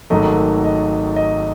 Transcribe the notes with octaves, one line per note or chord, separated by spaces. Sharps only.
G#1 G#2 D#3 F#3 A3 D#5
D#5
D#5